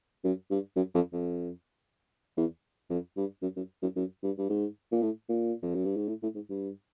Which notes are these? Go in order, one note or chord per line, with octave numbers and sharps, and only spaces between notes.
F#2
G2
F#2
F2
F2
E2
F2
G2
F#2
F#2
F#2
F#2
G2
G2
G#2
A#2
A2
A#2
F2
F#2
G2
G#2
A2
A2
G#2
G2